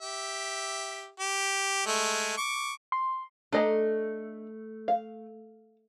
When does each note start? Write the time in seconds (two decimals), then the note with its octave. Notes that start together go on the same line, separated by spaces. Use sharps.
0.01 G4 E5
1.20 G4
1.86 G#3 A3
2.37 C#6 D6
2.92 C6
3.52 A3 D4 D#5 A#5
4.88 F5